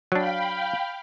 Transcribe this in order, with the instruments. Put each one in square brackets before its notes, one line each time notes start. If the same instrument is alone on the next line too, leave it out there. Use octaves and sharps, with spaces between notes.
[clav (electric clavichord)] F#3 D4 [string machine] F5 G5 B5